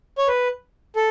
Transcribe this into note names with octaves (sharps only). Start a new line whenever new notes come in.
C#5
B4
A4